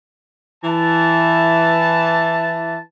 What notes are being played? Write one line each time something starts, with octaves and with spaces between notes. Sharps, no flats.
E3 A5